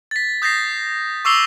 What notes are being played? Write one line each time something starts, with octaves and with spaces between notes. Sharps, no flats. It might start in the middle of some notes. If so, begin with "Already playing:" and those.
A6 B6
D#6 G6 A6 A#6 C7
C#6 D6 E6 C7 F7 G7